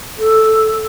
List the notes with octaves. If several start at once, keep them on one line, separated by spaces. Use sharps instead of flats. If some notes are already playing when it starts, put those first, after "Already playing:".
A4